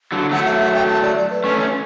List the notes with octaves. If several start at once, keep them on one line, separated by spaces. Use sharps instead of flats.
D3 F#3
F#3 A3 F#5
E5
E5
G5
A5
D5
D5
B4
A3 C#4 B4
C#5